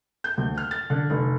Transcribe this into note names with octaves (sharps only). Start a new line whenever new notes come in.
G6
D2
F6
A6
D3
F1